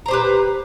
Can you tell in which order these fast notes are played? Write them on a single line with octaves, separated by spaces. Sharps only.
A#5 C5 G4 B4